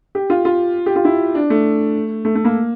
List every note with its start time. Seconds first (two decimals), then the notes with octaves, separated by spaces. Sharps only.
0.15 G4
0.30 F4
0.45 F4
0.86 G4
0.96 F4
1.05 E4
1.35 D4
1.50 A3
2.25 A3
2.35 A3
2.45 A#3